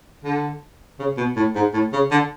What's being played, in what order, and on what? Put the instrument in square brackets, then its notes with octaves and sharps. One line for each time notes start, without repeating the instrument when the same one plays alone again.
[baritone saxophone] D3
C#3
B2
A2
G#2
A2
C#3
D3